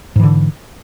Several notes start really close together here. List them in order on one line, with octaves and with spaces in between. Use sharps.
G#2 E3 D3